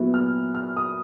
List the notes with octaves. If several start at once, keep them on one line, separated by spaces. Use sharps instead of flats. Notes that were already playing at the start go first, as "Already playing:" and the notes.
Already playing: A#2 F#3 B3 E4
F6
F6
D#6